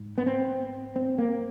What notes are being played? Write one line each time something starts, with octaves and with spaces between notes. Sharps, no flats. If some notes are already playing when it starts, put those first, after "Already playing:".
Already playing: G#2
B3
C4
C4
A#3